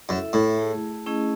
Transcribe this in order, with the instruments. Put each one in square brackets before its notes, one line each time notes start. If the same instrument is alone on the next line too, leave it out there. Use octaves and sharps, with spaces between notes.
[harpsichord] F#2 [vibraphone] E4 A4 E5
[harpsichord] A2
[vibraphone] A3 E4 G#4
A3 C#4 E4 G#4 D#5